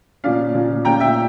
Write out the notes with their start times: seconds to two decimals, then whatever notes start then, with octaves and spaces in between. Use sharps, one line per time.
0.24 A#2 F3 C#4 D5 F5
0.54 A#2 F3 C#4
0.85 A#2 F3 C#4 G5 A#5
1.00 E5 G5